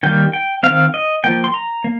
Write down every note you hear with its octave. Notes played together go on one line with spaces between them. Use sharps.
D#3 G3 A#3 G5
G5
D#3 C4 F5
D#5
F3 A#3 G5
C6
A#5
A#3